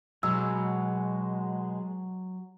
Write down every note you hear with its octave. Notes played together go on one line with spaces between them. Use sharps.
B2 F#3 G#3 E6